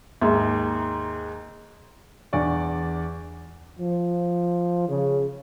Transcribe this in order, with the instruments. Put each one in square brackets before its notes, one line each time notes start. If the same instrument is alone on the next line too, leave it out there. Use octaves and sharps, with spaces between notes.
[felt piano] D#2 G#2 E5
[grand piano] E2 D4 D5 C#6
[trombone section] F3
C#3